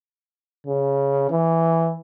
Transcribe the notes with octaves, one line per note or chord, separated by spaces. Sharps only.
C#3
E3